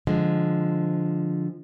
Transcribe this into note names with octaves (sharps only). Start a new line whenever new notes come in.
D3 F3 G#3